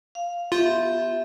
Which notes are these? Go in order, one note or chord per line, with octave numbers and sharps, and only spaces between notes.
F5
B3 F4 G4 E5